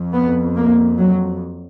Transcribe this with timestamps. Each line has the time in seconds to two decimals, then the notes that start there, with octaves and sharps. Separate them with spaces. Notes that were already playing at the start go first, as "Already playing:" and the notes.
Already playing: F2
0.14 B3
0.56 A#3
0.99 F#3